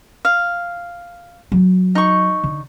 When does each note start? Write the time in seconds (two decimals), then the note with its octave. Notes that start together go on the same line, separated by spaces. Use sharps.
0.25 F5
1.52 F#3
1.95 D#4 C#6
2.44 D3